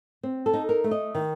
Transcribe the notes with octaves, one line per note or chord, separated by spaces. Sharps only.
C4
A4
D#4
A#4
A3
D#5
D#3